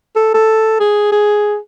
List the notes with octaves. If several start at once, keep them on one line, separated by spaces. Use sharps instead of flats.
A4
A4
G#4
G#4